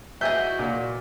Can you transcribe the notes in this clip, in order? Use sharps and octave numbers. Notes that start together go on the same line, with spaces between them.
E3 F#4 G#4 D#5 E5 G6
A#2